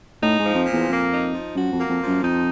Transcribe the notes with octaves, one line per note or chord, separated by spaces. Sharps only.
A2 D#4
G#2
F3
F2
A#2
E2
F2 A#3
D#4
F3
F#2 F#4
F2
A#3
F2
F3
F#2
F2 D#4